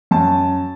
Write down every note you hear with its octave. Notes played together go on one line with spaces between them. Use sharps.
F#2 A5